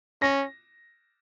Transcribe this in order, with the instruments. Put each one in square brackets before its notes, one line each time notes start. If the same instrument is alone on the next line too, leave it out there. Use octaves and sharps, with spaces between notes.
[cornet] C#4 [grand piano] A#6